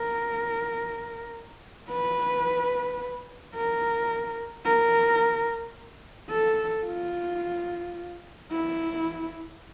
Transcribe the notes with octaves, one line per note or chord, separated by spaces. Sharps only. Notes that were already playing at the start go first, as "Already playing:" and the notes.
Already playing: A#4
B4
A#4
A#4
A4
F4
E4